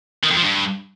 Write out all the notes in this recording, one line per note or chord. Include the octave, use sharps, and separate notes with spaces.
D#3
F2
F3
G2